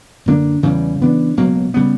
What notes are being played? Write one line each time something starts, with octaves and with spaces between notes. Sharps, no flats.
F#2 D3 A#3 D4
E2 C#3 E3 G3
C#3 E3 B3 D4
C#2 B2 F#3 A#3
C#3 G3 B3